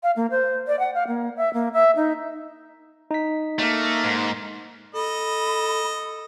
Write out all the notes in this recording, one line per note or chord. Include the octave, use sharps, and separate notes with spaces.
F5
A#3
C5
D5
F#5
F5
A#3
E5
A#3
E5
D#4
D#4 B6
A3 A#3
G#2
A4 D#5 B5